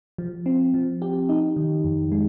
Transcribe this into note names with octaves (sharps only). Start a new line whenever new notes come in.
F3
C4
F3
G4
D#4
D#3
F2
G#3